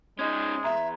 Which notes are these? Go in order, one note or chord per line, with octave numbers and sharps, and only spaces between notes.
G#3 C#4 D#4 G#6
B1 E2 E5 A#5 C6